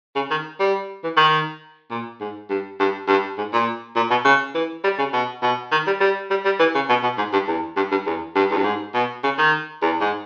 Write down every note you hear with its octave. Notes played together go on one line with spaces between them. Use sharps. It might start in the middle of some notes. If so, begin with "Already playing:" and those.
C#3
D#3
G3
E3
D#3
A#2
G#2
G2
G2
G2
G#2
A#2
A#2
B2
C#3
E3
G3
C#3
B2
B2
D#3
G3
G3
G3
G3
E3
C#3
B2
B2
G#2
G2
E2
G2
G2
E2
G2
E2
G2
G#2
B2
C#3
D#3
E2
G#2